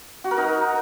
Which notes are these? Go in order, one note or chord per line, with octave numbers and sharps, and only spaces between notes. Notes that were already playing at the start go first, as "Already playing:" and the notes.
F#4
A#4
D#4
A#4